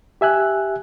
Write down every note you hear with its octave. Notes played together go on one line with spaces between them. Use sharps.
G4 E5 G#5 F#6